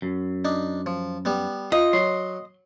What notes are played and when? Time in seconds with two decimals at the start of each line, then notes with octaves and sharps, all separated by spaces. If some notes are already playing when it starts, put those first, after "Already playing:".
0.02 F#2
0.45 D4 D#4
0.86 F3
1.25 G3 B3
1.72 F4 D#5
1.93 F#3 C6